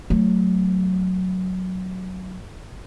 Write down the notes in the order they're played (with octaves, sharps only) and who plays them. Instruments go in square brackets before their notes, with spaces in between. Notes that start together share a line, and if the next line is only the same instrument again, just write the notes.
[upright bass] F#3 A3